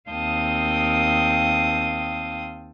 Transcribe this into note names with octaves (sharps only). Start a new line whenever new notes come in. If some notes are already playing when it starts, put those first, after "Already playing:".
D#2 C4 F5 G5 A5 D#6